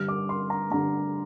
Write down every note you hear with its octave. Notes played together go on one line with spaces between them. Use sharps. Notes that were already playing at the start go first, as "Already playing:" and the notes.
Already playing: G2 D3 F6
D6
C6
A#5
G2 D3 A#5